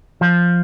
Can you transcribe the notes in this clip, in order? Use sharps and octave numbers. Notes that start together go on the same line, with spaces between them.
F3